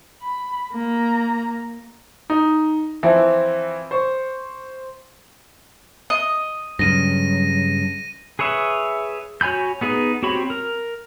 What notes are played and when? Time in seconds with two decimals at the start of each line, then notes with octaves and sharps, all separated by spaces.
0.22 B5
0.73 A#3 A#5
2.30 D#4
3.03 E3 F3 C4 E4
3.91 C5 C#6
6.10 D#5
6.79 G2 C#3 F#3 A#6 D#7
8.39 G#4 B4 C#5 E5
9.41 F#4 C#5 G#5 B5 G6
9.81 B3 D#4 G#4 B4
10.23 C4 F#4 G4 C#5 B5
10.50 A#4